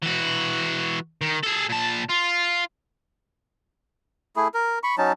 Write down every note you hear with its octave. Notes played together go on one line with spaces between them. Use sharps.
E3 F#4
D#3
G#4 A4
A#2 A5
F4
A3 E4 G#4
A#4
B5 C#6
F#3 C#4 D#4 A5